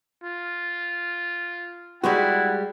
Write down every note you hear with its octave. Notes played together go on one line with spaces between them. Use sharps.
F4
G3 G#3 E4 F#4 F#5